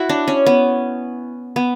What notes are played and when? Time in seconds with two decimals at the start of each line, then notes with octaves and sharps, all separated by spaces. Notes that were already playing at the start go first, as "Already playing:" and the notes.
Already playing: E4 F#4
0.09 D4
0.28 C#4
0.46 B3
1.56 B3